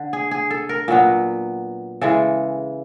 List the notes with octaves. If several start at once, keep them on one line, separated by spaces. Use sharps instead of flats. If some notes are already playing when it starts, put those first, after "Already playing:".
Already playing: D3
G#4
G#4
A4
A#4
A#2 F#3 B3
C#3 E3 G#3 A4